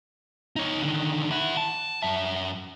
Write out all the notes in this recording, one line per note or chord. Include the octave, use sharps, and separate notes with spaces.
D#4 C#5
D3 D#3
E4 F#5
A5
F#2 E5